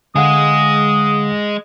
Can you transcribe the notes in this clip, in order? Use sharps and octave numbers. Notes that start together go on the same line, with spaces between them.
D3 G#3 G#4 F5 F#5 D#6